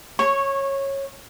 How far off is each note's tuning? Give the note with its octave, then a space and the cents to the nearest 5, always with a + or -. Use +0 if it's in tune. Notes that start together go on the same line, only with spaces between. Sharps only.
C#5 -15 C#6 +0